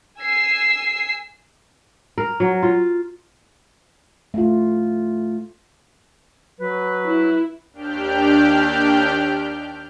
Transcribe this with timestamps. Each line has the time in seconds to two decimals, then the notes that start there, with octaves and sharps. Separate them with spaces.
0.20 G#5 E6 C7
2.18 A#4
2.40 F#3
2.63 F4
4.34 A3 F4
6.59 F#3 B4
7.06 E4
7.73 D#2 D4 G4 F6 G6